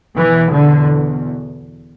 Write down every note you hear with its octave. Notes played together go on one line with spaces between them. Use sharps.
E2 B2 E3
D3